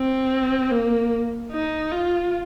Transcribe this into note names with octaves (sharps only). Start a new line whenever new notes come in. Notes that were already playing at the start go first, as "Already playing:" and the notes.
Already playing: C4
A#3
D#4
F4